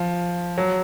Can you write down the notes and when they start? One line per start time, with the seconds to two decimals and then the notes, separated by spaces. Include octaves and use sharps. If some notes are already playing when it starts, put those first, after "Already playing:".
Already playing: F3
0.58 F#3